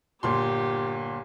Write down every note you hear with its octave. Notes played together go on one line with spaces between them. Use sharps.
G1 A#2 G4 C6